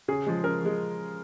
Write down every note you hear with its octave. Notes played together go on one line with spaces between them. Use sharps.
C#3 G#4
F3 G#3
C#3 A#4
F3 G#3